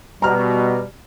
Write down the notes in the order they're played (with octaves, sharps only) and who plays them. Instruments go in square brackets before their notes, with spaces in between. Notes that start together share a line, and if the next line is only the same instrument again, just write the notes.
[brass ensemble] B2 [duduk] G3 [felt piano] A#5 F6